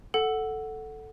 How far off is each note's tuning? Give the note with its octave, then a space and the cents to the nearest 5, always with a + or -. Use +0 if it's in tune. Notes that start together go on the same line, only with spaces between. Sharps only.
A4 +0 F#5 +0